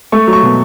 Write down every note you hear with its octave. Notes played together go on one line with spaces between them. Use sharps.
A3 C#6
F#3
C#6
B2